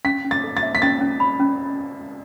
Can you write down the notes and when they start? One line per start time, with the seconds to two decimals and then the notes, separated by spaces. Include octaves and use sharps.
0.05 C#4 B6
0.24 C#4
0.31 A6
0.44 A4
0.57 A6
0.63 E5
0.75 B6
0.82 C#4 A6
1.01 C#4
1.20 B5
1.40 C#4